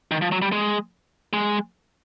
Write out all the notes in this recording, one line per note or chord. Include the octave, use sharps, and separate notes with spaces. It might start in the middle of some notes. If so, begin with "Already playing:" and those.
D#3
F3
F#3
G3
G#3
G#3